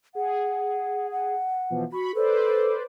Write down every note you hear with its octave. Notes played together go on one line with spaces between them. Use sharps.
G#4 F#5
F#5
B2 E3 F3
F#4 B5 C#6
A4 B4 C5 D5